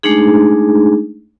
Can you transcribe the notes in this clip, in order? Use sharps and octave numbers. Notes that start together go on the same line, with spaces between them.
G#3 A3 D4 D#4 G#4